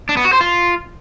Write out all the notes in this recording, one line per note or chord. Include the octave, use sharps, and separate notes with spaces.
D4
B3
F#4
C5
F4